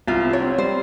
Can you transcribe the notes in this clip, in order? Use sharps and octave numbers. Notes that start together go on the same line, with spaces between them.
C2 F4
C3
C#5
C4
G3 C5